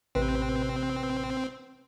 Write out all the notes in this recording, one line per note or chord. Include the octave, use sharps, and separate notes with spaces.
A1 C3 C4 B4